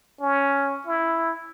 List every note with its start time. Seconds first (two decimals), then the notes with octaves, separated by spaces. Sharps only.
0.21 C#4
0.87 E4